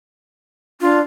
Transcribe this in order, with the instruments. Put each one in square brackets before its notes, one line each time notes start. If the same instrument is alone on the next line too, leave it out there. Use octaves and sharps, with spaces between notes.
[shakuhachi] D4 [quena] F4